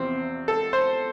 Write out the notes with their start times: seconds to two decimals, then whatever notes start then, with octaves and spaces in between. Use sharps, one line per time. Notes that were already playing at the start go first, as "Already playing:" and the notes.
Already playing: E2 C3 F3 C4
0.48 A4
0.73 C5